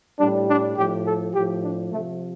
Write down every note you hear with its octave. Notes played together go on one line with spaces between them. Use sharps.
A2 G3 D4
D4
A2 F3 G4
A4
A2 F3 G4
D4
C3 F3 A3